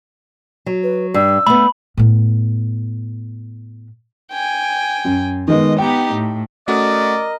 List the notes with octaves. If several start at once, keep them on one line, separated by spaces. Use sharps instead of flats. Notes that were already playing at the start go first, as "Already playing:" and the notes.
F#3
B4
G2 E6
A3 B3 B5
A2 B3
G5 G#5
F#2
D#3 G#3 B3 D#5
B3 D#4 G4 G5
A2
A3 C#4 F#4 A#4 D5 D#5